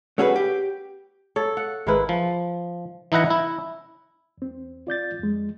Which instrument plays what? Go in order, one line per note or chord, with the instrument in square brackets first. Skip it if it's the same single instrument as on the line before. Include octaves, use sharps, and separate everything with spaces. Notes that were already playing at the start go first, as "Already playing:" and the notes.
[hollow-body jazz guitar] A3 C#4 F#4 G#4 A4 B4
G4
[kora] A4 [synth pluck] C#5
[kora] F#5
[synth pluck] G#1 A#4 B4 [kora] G#3 E4
[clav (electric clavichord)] F3
E3 D#4 E4 F#5 A#5
E4
[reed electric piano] E2 C4
F4 D5 G6 A6
F2 G#3